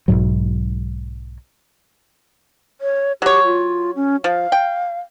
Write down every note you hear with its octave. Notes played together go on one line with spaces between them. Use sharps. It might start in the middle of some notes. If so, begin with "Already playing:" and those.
B1 F2 G#2 F#3
C#5
F#3 G4 C#5
F4
C#4
F3 F5
G5